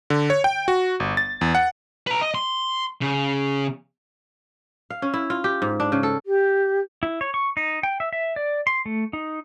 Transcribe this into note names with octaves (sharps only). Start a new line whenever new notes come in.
D3
C#5
G5
F#4
G1
A6
E2
F#5
B4 A#5
D#5
C6
C#3
F5
C#4
E4
F4
G4
G#2
D4
C#3
A4
G4
E4
C#5
C#6
D#4
G5
E5
E5
D5
C6
A3
D#4